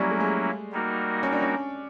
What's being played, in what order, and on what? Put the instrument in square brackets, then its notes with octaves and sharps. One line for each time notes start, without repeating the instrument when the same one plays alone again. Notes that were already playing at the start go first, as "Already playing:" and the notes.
Already playing: [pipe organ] F#3 A#3 C#4 E4 [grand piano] G3
[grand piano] A3
G#3
[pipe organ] G3 A#3 D#4 F#4 A#4
[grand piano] C#4
D4
C#4